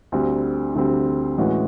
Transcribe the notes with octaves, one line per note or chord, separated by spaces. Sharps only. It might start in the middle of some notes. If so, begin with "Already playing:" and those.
D2 D3 G3 C4
D2 D3 G3 C4
A2 E3 G#3 C#4 F#4